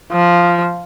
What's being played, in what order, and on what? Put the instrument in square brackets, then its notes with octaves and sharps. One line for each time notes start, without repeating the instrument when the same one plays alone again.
[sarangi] F3